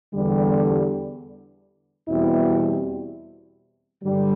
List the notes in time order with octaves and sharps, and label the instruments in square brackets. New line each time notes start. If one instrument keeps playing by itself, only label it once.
[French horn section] E2 D3 G3
E2 B2 G3 C4 E4
G2 D3 G3